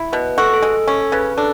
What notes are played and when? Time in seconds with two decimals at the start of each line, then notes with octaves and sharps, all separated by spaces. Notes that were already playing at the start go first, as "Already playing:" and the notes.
Already playing: E4
0.13 B2 B4
0.38 F#4 A4
0.54 A4
0.62 G#3
0.88 C#4 A4
1.12 C#3 B4
1.38 D4 A4